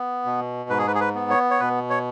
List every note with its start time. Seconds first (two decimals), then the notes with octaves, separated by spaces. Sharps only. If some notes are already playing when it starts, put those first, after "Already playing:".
Already playing: B3
0.25 B2
0.69 G#2 B4
0.78 G#4
0.87 B4
0.95 G#4
1.00 B4
1.15 B3
1.30 C#5
1.51 C#5
1.60 B2 B4
1.90 C#5